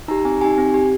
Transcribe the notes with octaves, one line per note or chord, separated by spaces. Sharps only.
D#4 G4 A#5
C4 G#5
D#4 G4 G#5
C4
G4